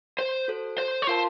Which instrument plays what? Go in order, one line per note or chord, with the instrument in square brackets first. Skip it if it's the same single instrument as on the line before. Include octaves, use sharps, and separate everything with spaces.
[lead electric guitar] C5
[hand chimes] F#4 A4 C5
[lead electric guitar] C5
C#5
[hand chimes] F4 A#4 F5 A5 [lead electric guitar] C5